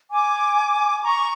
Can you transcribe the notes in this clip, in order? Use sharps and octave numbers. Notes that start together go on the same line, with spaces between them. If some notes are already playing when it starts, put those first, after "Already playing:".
G#5 D6
A#5 C#6